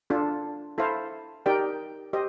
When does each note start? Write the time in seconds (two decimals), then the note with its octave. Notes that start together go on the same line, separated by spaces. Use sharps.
0.10 D4 F4 A4
0.78 E4 A4 C5 F5
1.46 D#4 G4 A#4 D5 G5
2.13 G4 C5 D#5